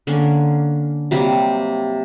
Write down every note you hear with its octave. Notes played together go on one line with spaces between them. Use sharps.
D3 A#3 C#4
C3 F#3 G3 A#3